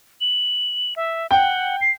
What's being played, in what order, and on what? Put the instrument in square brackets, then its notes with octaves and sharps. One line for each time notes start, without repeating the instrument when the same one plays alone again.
[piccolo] F#7
E5
[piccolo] F#5 [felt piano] G5
[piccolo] C7